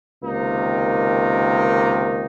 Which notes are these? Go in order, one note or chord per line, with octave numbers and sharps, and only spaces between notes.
C#2 C3 D#3 A#3 D#4